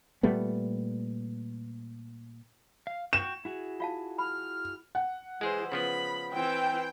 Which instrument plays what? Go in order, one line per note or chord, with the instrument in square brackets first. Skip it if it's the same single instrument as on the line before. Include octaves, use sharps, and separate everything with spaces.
[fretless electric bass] A#2 G3 A3 B3
[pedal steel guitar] F5
[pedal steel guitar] F#4 G5 C#6 [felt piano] E7
[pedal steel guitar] E4 F#4 G#4
[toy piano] F4 F5 A5
[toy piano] B5 [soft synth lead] F6
[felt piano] F#5
[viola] E3 C5 [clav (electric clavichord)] G#3 G#4
[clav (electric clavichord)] C#3 F3 B3 [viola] B5
[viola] E3 C4 [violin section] G5